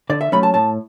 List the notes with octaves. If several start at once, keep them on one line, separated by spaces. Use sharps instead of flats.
D3 D5
E5
F#3 A3 C#4 B5
A5
A2 A5